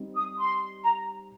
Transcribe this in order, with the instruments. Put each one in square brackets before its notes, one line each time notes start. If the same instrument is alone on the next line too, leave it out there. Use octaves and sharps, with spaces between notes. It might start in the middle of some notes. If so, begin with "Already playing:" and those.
Already playing: [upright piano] G3 C4 D#4
[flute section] D#6
C6
A#5